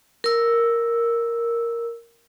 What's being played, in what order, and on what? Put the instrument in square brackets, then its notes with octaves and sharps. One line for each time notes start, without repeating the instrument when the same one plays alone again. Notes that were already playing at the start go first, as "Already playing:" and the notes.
[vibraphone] A#4 E6